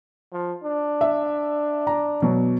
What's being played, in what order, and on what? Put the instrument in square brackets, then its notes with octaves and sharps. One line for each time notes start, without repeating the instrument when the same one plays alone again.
[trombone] F3
D4
[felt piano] E5
A#5
B2 F#3